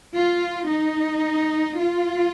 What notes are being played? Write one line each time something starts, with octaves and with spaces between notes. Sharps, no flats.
F4
D#4
F4